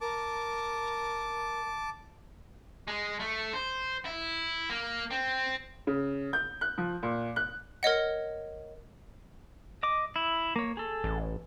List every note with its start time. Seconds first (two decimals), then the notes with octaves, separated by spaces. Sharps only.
0.01 A#4 A5 D6
2.88 G#3
3.20 A3
3.53 C5
4.05 E4
4.70 A#3
5.11 C4
5.87 C#3
6.33 G6
6.61 F#6
6.78 F3
7.03 A#2
7.36 F#6
7.83 A#4 C#5 D#5 F#5
9.83 D#5 D6
10.16 E4
10.56 A#3 C#5
10.77 G#4 A4
11.04 A1